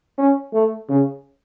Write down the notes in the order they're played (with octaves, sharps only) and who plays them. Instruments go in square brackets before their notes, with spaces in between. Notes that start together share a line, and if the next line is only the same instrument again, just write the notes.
[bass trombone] C#4
A3
C#3